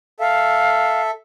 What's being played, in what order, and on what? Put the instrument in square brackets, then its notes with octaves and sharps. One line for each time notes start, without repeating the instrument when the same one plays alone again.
[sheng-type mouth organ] A4 E5 [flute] F5